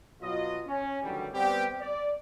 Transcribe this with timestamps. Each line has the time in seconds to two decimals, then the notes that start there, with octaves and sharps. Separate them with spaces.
0.22 B2 F#3 F4 D#5
0.67 C#4
1.03 D#2 A2 D3 E3 F#3 G3
1.33 G3 B3 C4 G4
1.80 D5